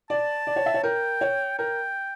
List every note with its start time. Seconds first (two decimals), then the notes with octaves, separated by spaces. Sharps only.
0.10 D5 A5
0.47 D5
0.56 C#5
0.66 E5
0.74 C#5
0.83 A#4 G5
1.21 C#5
1.58 A#4 G5